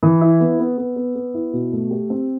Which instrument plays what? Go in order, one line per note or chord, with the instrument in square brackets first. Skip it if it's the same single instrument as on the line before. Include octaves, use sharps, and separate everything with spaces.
[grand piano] E3
E4
B3
B3
B3
B3
B3
E4
B2
A3
G4
C4